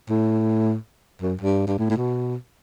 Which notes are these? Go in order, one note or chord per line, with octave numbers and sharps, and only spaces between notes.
A2
F#2
G2
G2
A2
A2
B2